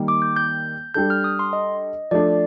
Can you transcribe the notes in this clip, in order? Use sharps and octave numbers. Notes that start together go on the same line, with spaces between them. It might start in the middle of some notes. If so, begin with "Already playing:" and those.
Already playing: D#3 G3 A#3
D6
G6
G6
G3 D4 A4 G6
F6
D#6
C6
D#5
F3 A3 D4 D5